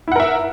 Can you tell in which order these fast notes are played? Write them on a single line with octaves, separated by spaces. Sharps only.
E4 F#5 A#4 E5